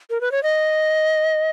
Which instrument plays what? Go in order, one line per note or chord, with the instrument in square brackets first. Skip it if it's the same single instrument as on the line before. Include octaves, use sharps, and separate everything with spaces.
[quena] A#4
B4
C#5
D#5